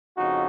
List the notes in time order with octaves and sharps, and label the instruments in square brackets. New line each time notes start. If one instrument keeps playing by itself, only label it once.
[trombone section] F2 C#3 D#4 F#4